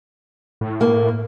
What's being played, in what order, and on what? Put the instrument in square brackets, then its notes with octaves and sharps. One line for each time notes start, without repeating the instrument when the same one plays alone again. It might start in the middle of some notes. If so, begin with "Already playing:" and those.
[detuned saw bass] A2
[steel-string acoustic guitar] A#3